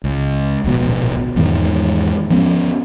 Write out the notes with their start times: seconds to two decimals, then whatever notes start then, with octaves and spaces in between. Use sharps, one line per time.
0.04 C#2
0.64 D1 A#1 B2
1.36 E2 G#2 D#3
2.31 F3 B3 C#4